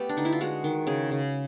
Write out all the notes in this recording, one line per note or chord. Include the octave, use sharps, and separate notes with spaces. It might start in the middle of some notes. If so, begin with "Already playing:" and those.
Already playing: A3 B3 G4
D4
D3 D#4
E4
F4
G#3 F#4
D#3
C#3 G#4
C#3